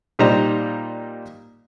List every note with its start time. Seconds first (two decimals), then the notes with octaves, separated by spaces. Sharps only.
0.19 A#2 G3 D#4 C5 A#5